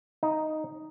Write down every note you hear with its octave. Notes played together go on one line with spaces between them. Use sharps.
D#4